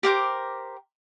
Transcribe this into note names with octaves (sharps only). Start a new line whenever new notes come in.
G4 A#4 C5 D6